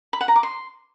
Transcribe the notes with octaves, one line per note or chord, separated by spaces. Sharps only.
B5
F#5
A#5
D6
C6